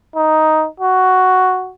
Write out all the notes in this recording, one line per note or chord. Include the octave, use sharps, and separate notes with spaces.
D#4
F#4